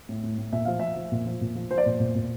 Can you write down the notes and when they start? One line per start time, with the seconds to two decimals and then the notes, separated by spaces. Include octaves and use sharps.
0.09 A2
0.23 A2
0.38 A2
0.52 A#2 E5
0.65 F3 F5
0.79 F3 E5
0.96 F3
1.12 A#2
1.26 F3
1.41 A#2
1.55 F3
1.71 F3 C5
1.78 D5
1.84 A#2 C5
2.00 A#2
2.15 A#2